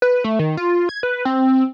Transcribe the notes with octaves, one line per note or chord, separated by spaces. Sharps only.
B4
A3
D#3
F4
G#6
B4
C4